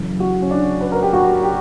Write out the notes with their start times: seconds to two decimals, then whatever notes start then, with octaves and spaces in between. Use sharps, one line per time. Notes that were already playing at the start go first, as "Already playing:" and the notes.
Already playing: F#2 C#3 E3
0.20 F#4
0.42 C#4
0.51 D4
0.81 B4
0.92 A#4
1.02 G4
1.13 F#4
1.43 G4